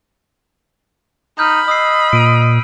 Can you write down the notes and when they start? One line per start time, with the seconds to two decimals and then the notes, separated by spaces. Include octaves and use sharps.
1.39 D#4 B5 F6 G6
1.68 D#5 D#6 E6 C7
2.13 A#2 D7 D#7